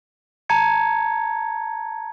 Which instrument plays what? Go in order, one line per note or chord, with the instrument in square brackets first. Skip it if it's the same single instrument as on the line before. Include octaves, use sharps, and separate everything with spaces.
[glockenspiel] A5 A#5 G#6 C#7